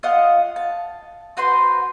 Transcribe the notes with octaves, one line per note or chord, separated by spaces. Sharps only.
F4 D#5 F5 F#5
A5
F#4 B4 C5 C6